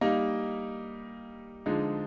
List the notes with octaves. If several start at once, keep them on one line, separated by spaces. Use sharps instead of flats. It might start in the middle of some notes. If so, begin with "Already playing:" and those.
G3 A#3 D#4
D3 F3 G#3 D#4